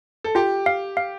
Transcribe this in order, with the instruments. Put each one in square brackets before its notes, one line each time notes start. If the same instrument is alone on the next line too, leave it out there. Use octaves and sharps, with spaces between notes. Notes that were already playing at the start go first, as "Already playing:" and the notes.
[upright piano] A4
[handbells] F4 [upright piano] G4
[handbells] F5
F5